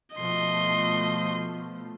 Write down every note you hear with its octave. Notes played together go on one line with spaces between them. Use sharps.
B2 F3 A3 D#5 C6